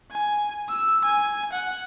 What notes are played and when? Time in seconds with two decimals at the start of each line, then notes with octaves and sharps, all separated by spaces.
0.11 G#5
0.69 E6
1.05 G#5
1.53 F#5